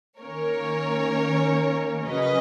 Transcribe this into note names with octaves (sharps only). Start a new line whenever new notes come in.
D#3 A#3 C#4 A#4 C#5
C#3 F#3 C#4 B4 D#5